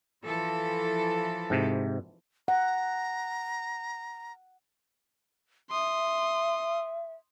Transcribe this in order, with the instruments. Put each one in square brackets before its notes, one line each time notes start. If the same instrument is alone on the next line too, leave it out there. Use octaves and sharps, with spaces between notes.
[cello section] E3 F3 A4
[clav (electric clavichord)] G#2 C3
[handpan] F#5 [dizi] A#5
[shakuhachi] E5 [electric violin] C6 D#6